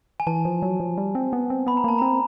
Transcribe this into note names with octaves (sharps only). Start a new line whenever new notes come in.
G#5
E3 A5
F3
F#3
F3
G3
C4
B3
C4
B3 B5
A#5
A#3 A5
C4 A#5